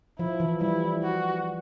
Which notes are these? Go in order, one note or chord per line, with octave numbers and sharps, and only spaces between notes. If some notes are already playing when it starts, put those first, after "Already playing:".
F3 E4
E3
G3 E4
F#4